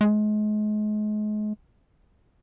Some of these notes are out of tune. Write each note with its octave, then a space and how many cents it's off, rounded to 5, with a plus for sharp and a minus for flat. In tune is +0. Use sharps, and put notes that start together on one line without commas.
G#3 +35